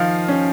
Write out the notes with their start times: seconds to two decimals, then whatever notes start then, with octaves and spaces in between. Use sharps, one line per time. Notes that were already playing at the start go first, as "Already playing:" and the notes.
Already playing: D#3 F3 F5
0.28 C#4